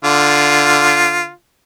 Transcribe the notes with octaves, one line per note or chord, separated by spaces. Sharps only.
D3 F4